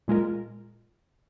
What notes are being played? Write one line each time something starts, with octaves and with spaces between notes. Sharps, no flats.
A#2 G#3 F4 A#4